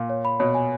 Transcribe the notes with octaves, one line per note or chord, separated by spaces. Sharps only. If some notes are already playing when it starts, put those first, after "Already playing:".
Already playing: A#2 F5
C#5
B5
B2 C#5
G#5